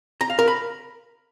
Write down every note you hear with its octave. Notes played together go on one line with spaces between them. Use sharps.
A#5
F5
A#4
B5